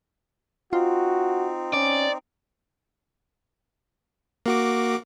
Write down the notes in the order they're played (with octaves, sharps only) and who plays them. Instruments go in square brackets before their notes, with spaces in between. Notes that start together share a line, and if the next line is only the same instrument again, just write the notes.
[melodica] C4 D#4 [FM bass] F4 [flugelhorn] F#4
[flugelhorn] C#4 [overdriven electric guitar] D5
[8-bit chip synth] A#3 F#4 D6